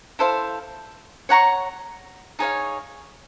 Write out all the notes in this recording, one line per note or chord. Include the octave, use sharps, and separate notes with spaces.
E4 A4 C5 F5
C#5 F#5 A#5 C#6
D#4 G#4 C#5 F5